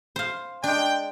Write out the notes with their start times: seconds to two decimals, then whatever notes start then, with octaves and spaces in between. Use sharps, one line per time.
0.16 C5 F5
0.64 G#3 D4 G5